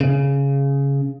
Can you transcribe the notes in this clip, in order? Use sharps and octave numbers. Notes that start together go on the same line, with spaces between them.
C#3